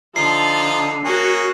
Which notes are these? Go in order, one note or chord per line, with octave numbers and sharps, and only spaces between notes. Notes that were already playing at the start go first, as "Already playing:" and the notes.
D3 F3 D#4 F4 C7
A#3 C#4 F#4 G#4